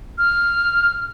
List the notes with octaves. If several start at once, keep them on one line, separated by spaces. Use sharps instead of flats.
F6